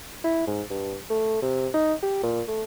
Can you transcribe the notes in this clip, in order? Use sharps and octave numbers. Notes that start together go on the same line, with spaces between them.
E4
G#2
G2
A3
C3
D#4
G4
A#2
A3